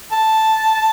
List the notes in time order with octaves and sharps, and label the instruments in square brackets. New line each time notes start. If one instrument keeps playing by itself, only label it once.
[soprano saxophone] A5